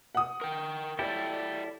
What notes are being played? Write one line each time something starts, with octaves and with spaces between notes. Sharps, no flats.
F#5 D#6
A#4 G5
E4 G4 A4 C#5 D5 G5